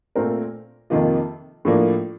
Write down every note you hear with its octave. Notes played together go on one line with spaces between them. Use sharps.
A#2 A3 C4 F4 A#4
F2 C3 D#3 A#3 F4
A2 F3 A#3 D4